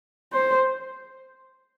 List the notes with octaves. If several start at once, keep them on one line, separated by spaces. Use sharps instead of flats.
C5